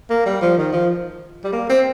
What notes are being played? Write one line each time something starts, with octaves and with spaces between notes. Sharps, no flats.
A#3
G3
F3
D#3
F3
G3
A#3
C4